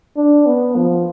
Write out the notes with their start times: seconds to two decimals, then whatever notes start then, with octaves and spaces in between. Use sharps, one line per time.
0.17 D4
0.46 B3
0.76 F3